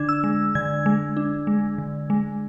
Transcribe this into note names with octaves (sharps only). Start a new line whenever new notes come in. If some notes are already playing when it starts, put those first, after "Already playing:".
Already playing: D3 D4 G#6
E6
G#3
D3 G#6
G#3
D4
G#3
D3
G#3